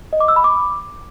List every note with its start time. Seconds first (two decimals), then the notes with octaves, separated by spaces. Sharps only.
0.13 D#5
0.20 D6
0.28 E6
0.36 B5
0.44 D6